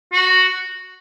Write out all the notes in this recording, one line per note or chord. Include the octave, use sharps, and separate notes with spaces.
F#4